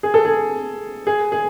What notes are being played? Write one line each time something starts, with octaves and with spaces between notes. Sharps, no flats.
G#4
A4
G#4
G#4
G#4